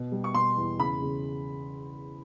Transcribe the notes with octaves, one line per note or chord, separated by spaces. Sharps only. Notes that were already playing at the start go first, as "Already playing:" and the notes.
Already playing: B2
G3
C#6
B2 C6
E2
C#3 B5
C#3